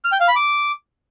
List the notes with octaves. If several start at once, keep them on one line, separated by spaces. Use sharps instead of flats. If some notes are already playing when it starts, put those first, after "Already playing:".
F6
G5
F5
B5
D6